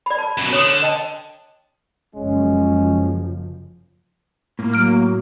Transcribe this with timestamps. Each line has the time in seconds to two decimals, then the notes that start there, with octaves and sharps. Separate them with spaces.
0.06 D5 B5
0.19 A5
0.38 F#2 B2
0.53 D3 C#5 D#6
0.83 D#5 G5 A5
2.15 F#1 F#2 F3 G#3 C#4
4.59 A2 A#3
4.74 F#3 F6 D7